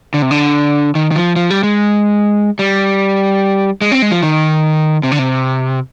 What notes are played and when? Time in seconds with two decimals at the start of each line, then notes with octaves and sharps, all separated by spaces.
0.14 D3
0.22 C3
0.31 D3
0.95 D#3
1.11 D#3
1.16 F3
1.36 F3
1.50 G3
1.63 G#3
2.59 G3
3.81 G#3
3.92 C4
4.02 G#3
4.11 F3
4.23 D#3
5.03 C3
5.12 D3
5.19 C3